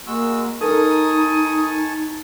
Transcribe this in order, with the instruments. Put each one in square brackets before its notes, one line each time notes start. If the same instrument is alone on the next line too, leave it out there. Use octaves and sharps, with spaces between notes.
[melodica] G#3 F#4 E6 [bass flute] A#3
[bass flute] D#4 [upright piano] A4 A#4 [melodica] G#5 A5 C#6 [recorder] D#6